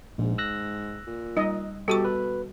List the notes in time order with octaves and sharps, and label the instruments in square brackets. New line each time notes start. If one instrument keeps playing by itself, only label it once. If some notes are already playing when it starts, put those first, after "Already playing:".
[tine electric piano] A#1 [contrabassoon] G#2
[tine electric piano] E6 F#6 A#6
[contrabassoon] A#2
[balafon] G3 [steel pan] D#4 D#5
[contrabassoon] B2 [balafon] G3 F#4 C#6 [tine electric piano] G4 [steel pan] A4
[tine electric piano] B4